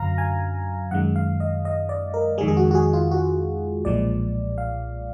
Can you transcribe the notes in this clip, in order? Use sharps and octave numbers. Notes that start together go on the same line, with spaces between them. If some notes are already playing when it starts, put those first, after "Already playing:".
Already playing: F#2 D3 F#3 F5 A#5
G#5
F#2 D#3 G#3 F#5
F5
D#5
D#5
D5
A#4
F2 D#3 G#3 G#4
G#4
F#4
F#4
G#4
F4
F#4
B1 A#2 F3 G#3 D5
F5